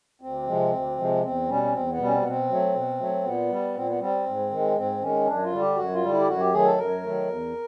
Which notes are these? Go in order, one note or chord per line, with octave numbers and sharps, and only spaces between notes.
D2 C4
C3 F3 G#3
D2
C3 F3 G#3
E2 C4
B2 G3 C#4
C#4
E2 C4
B3
B2 G3
C#4
C4
B3
B2 C4
F#3 A3
B2
F#3 A3
A#2 B3
G3
A#2 C4
B3
G3 C4
G#2
D#3 G#3
G#2 C4
D#3 G#3 C#4
F#2 D4
F4
D3 G3
G4
F#2 F#4
F4
D3 G3
E4
G4
F#2 F#4
G4
D#3 F#3 A3 G#4
A4
F#2 A#4
D#3 F#3 A3
E2